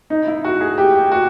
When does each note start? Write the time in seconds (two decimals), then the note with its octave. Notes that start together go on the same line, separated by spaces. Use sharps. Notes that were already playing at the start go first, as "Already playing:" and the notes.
0.10 D#4
0.27 E4
0.45 F#4
0.61 G#4
0.78 G4
1.12 F#4